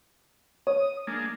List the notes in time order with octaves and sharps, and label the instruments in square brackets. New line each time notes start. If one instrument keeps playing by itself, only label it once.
[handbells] C#5 [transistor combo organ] D#6
[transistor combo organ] G#3 A#3 D4